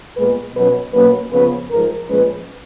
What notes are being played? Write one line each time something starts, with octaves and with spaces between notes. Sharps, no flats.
A#2 G#3 B3 B4
B2 F#3 C#4 B4
B2 F#3 A#3 C#4 B4
C#3 F3 B3 B4
G#2 F3 G#3 A#4
A#2 F3 G#3 C#4 B4